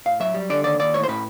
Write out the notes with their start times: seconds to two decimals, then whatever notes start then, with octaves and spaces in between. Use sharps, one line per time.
0.06 A2 F5
0.20 F#3 E5
0.34 G3
0.50 D3 D5
0.64 D#2 D5
0.79 D#2 D5
0.94 A2 C#5
1.03 C5
1.08 A2 B4